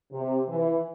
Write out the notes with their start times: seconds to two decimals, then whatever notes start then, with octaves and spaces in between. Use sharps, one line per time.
0.13 C3
0.49 E3